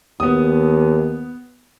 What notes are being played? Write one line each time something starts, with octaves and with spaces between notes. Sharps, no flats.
D#2 B3 D#6